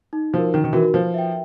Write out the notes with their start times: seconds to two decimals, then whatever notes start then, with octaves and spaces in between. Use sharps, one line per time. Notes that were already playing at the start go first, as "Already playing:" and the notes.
0.13 D#4
0.33 F3 F#4 A#4
0.53 D#3 D#4
0.64 D#3
0.73 E3 F#4 A#4
0.93 F3 B4
1.14 E5 G5